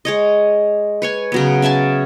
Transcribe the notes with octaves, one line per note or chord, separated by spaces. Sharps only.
G#3 C#5 D#5
B4 C#5 G#5
C#3 F#3 B3
C#4 E5 G#5 A5